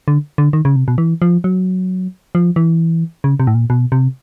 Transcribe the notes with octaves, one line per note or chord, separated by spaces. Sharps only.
D3
D3
D#3
C#3
C3
B2
E3
F3
F#3
F3
E3
C#3
C3
A2
A#2
B2
C3